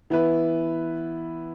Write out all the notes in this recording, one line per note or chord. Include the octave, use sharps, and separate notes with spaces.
E3 B3 E4 B4